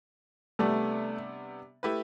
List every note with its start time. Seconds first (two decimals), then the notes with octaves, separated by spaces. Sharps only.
0.59 C3 G3 A3 B3 D4
1.83 A3 E4 G4 B4